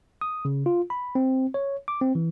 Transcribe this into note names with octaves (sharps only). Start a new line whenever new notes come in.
D#6
C#3
F4
B5
C4
C#5
D6
C4
E3